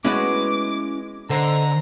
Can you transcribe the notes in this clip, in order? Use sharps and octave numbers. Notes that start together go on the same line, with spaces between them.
G#3 B3 C#4 E4 F#4 C#5 D6
D3 A4 C5 D#5 A#5